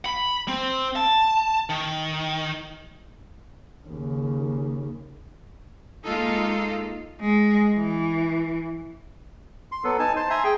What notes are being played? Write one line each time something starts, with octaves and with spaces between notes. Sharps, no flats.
B5
C4
A5
D#3
D#2 C#3
G#3 A#3 D#4 F4 A4
G#3
E3
C6
F#3 B3 A4
D#4 G#5 A5
C5 A5 C6
E5 G#5 A#5 C6
G#4 G5